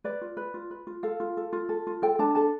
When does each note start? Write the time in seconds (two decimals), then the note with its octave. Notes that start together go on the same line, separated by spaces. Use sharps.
0.04 B4 D5
0.21 F4
0.37 B4
0.54 F4
0.71 B4
0.87 F4
1.03 A4 F5
1.20 F4
1.37 A4
1.53 F4
1.69 A4
1.87 F4
2.02 A4 G5
2.19 D4 A5
2.35 A4 A5